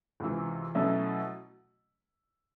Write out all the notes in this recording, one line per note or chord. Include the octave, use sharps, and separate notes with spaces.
C#2 C3 E3
B2 F#3 A3 C#4 E4